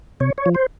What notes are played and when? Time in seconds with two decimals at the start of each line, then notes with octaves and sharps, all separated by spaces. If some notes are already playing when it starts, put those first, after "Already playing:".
0.20 C3 C#5
0.38 C#5
0.46 F3
0.55 C5